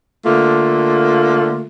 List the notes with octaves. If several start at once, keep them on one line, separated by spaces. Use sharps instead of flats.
D3 A3 A#3 F4